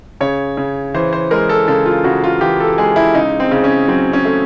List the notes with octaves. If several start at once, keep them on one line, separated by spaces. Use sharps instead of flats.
C#3 C#5
C#3
E3 C5
C5
G#3 A#4
A4
C#3 A4
F4
C#3 F#4
F4
E3 G4
A4
G#3 G#4
E4
C#3 D#4
C4
C#3
C#4
F#3 C4
C#4
A3